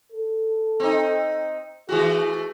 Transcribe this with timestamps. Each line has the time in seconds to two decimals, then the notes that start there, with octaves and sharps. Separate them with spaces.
0.12 A4
0.80 C4 D#4
1.89 E3 A3 F#4 G#4